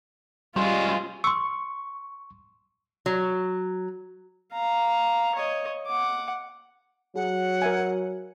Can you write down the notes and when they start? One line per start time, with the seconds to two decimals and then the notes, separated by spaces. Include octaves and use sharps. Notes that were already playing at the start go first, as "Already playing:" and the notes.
0.56 G3 G#3 C#4 F4 C5
1.24 C6 C#6 E6
3.06 F#3
4.53 F5 A#5
5.35 C#5 D#5
5.87 F#5 D6
7.16 F#3 G#4 F#5
7.62 A#4 E5 G#5